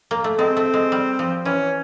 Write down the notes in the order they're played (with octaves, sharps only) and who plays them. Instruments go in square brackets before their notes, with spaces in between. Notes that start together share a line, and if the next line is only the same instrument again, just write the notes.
[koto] A#3
A3
[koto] G#3 [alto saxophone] C4
[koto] A3
G#3
G3
F3
[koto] E3 [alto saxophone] C#4